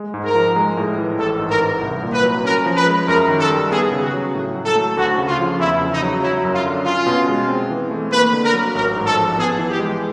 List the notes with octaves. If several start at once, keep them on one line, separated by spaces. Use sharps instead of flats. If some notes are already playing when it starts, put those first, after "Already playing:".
Already playing: G#3
G#2
A#4
F3
G#3
A2
E3
A1 A4
G#2
A#4
E3
C2
A#2
B4
F#3
C#4 A#4
F3
B4
G#3
F#2 A#4
D#3
A4
G3
B3 G#4
C#3
F#4
F#3
A2
F#3
A4
A3
D2 F#4
C#3
F4
F3
E2 E4
C#3
D#4
F#3
F#3 E4
F#2
F4
D3
C#4 F4
B2
G#3
C4
E3
A3
A#3 B4
D3
A#4
F#3
A1 A#4
G#2
A4
F3
B3 G#4
E3
G4
G#3